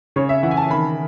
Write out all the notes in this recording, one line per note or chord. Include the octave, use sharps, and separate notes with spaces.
C#3 C#5
E5
E3 F#5
G#5
A5
D#3 B5